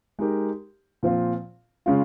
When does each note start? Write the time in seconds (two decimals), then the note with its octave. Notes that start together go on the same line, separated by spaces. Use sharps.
0.19 G#3 D#4 G4 A#4
1.03 A#2 F3 C4 F4
1.86 C#3 G#3 C#4 F4